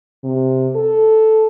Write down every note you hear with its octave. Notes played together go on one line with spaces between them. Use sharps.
C3
A4